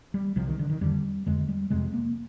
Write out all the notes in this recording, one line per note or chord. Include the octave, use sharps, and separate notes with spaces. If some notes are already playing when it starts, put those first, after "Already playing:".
G3
C2 C3 F3
D#3
D3
D#3
F2 D3 G3
F2 D3 G#3
G3
F2 C3 G#3
A#3